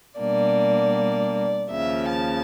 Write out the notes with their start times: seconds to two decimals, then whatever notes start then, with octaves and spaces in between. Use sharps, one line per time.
0.19 B2 G3 A#3 D4 D5
1.71 D#2 C#3 F3 E5
2.09 A5